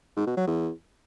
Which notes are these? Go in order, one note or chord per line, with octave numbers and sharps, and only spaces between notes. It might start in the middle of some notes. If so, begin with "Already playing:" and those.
G#2
B2
F#3
E2